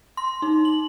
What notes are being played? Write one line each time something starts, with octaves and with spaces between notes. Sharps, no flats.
C6
D#4
F#7